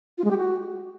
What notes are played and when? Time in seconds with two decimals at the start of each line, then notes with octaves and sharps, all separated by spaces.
0.18 F4
0.24 G#3
0.31 G4
0.37 F#4